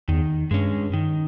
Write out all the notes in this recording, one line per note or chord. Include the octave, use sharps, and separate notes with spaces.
E2 D#3
G2 G#3 C#4
D#3